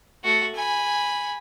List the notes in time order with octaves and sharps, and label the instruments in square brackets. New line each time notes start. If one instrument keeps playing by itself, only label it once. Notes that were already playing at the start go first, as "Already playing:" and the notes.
[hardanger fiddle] A3 F#4
G#5 B5